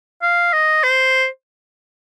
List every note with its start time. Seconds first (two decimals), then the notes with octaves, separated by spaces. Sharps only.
0.22 F5
0.53 D#5
0.84 C5